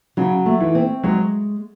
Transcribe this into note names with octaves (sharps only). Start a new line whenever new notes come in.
C#3 F#3
A3
E3
C4
F#3 G#3